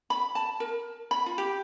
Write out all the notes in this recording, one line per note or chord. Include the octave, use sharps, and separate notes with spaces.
B5
A5
A#4
B5
F4
G4